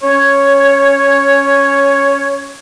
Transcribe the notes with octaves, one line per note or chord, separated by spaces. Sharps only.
C#4 C#5